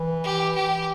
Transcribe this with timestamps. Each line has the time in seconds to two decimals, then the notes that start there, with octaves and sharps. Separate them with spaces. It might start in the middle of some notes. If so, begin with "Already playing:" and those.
Already playing: E3
0.24 G4
0.55 G4